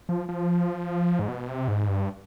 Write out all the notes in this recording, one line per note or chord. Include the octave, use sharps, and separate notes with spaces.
F3
F3
G#2
B2
C3
G#2
G2